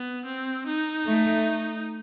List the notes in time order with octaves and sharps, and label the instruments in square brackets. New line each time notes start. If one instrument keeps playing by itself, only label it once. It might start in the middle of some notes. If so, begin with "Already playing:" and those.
Already playing: [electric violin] B3
C4
D#4
[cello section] A3